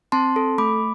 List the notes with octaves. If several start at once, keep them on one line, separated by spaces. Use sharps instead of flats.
C4 A5 C6
A4
A3 B5 D6